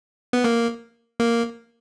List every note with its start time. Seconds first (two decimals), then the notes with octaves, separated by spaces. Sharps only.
0.33 B3
0.44 A#3
1.20 A#3